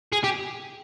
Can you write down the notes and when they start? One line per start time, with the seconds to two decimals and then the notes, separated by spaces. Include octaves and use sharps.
0.12 G#4
0.24 G4